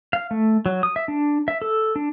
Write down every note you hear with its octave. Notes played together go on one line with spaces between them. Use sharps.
F5
A3
F#3
D#6
E5
D4
E5
A4
D4